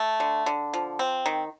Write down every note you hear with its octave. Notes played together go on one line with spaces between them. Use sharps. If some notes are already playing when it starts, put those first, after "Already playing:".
Already playing: A3
D3
D3
F3
C4
D#3